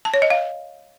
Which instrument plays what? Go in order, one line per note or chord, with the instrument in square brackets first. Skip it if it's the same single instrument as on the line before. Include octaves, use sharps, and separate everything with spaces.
[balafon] A5
C#5
D#5
F5